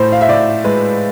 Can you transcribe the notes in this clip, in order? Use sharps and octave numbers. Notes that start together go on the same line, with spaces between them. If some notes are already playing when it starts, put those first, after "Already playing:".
Already playing: A2 C5
F5
E5
A2 D5
G#3 B4